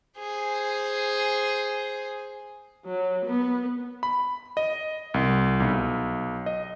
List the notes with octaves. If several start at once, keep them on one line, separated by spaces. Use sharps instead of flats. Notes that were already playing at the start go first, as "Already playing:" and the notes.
G#4 C5
F#3
B3
B5
D#5
C2
B1
D#5